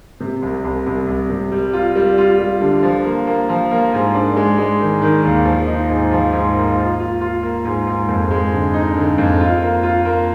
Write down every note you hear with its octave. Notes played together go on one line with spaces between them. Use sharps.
C3
C2
C2
C2
C2
C3
G3
F4
G3
F4
G3
D3
F3
A#3
A#3
F3
A#3
G#2
D4
G#3
G#3
D#3
D#3
D#2
F3
D#4
G#2
F3
G#2
A#3
F4
F4
F4
A#3
G#2
G#2
F2
G#3
D3
D#4
D3
F2
F4
A#3
F4
A#3